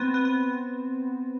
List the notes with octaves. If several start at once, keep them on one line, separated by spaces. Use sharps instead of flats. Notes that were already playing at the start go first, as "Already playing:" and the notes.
Already playing: B3 C4
B3
B3